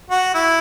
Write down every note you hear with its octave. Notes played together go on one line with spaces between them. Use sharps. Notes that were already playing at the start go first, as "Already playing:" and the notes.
F#4
E4